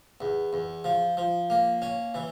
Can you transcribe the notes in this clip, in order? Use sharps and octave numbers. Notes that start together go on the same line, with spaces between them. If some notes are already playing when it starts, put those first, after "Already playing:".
E2
E2
F3
F3
A#3
C#4
E3